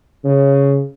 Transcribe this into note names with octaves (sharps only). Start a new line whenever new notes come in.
C#3